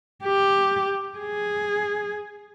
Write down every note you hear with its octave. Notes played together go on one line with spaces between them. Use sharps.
G4
G#4